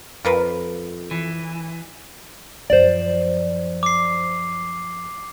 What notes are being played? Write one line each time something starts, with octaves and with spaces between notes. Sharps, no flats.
F2 F4 A#4 B4
E3
F#2 F3 C5 D5
D6 C7